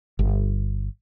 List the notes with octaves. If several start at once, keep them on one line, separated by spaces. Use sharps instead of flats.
G1